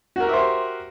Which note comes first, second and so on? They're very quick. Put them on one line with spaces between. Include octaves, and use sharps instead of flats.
F#4 A#4 G4 E5 C5